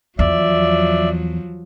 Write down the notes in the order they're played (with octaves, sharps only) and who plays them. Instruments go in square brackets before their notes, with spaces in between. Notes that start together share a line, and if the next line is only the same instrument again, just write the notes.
[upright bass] E2 [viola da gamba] F3 F#3 [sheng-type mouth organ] D5 E5